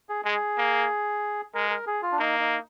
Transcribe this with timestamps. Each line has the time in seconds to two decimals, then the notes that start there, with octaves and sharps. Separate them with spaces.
0.09 G#4
0.25 G#3 G#4
0.58 A#3
1.54 G#3 A#4
1.70 A#4
1.87 G#4
2.02 F4
2.12 D4
2.19 A#3 D#4
2.40 D#4